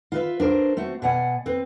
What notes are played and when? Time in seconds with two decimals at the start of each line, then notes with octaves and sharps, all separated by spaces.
0.12 F4 B4 E5
0.40 D4 A#4 C5
0.77 A3 C4 F#4
1.02 B2 D5 F#5 G#5
1.46 C4 B4